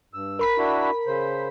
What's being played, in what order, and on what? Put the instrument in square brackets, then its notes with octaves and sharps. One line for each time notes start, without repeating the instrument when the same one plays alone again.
[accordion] G2 E6
[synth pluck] A#4 B5 B6
[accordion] D4 E4 F#4
C#3 C5